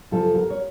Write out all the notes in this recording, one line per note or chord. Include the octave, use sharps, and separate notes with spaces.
F#2 C#3 F3 F4 A4
F#4 A#4
C#5